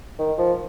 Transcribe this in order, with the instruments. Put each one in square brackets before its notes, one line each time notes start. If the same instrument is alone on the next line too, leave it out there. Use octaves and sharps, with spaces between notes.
[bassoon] D#3
F3